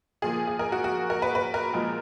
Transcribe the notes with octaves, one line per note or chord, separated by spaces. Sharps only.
A#2 F3 A#3 G#4
G#4
A#4
F#4
F#4
A#4
B4
B4
A#4
A#2 F3 G#3